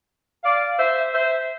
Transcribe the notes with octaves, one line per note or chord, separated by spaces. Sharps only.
D5 F5
C5 E5
C5 E5